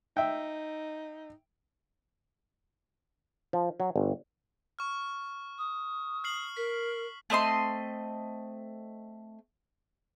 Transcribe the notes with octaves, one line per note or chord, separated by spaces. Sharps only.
D#4 E5 G5
F3
F#3
G1
C#6 F6
D#6
F6 C7 F#7
A#4 B6
A3 C4 D#5 C6